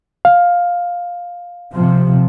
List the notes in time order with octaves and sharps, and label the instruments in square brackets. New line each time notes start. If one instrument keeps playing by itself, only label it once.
[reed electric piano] F5
[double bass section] C3 F3